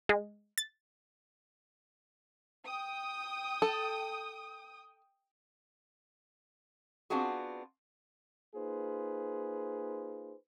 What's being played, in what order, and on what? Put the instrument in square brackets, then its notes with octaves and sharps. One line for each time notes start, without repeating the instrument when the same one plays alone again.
[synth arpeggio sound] G#3
A6
[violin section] G5 D#6
[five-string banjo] A4
[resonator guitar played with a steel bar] B3 C4 D4 F4 F#4 G#4
[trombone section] A#3 D#4 F4 G#4 B4 C5